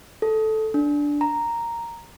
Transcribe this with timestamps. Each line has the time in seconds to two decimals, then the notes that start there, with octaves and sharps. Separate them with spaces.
0.22 A4
0.74 D4
1.21 A#5